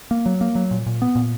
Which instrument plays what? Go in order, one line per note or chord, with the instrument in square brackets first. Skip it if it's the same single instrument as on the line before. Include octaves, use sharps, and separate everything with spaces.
[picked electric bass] A#3
F#3
A#3
F#3
A#2
A#2
B3
A#2